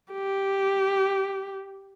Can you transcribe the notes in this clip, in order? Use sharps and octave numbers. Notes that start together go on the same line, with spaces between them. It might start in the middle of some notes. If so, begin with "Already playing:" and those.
G4